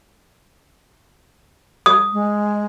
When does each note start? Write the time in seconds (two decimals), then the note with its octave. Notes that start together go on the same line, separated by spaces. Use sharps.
1.86 D#6
2.13 G#3